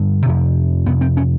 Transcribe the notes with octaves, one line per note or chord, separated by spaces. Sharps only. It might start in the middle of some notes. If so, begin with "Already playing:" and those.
Already playing: G2 D3
F2 C3
F2 C3 B3
C4
C#4